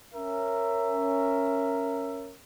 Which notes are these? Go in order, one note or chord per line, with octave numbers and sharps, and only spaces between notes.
C#4 A#4 E5